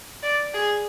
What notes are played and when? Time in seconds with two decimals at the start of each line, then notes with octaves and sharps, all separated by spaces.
0.23 D5
0.54 G#4